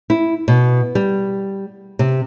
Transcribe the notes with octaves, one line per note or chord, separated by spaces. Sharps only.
E4
B2
G3
C3